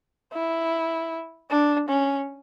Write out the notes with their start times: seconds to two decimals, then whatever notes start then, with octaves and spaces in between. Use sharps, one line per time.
0.33 E4
1.50 D4
1.89 C#4